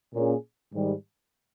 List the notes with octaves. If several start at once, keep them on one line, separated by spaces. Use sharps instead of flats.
A#2 A#3 C#4 G#4
G#2 D#3 G3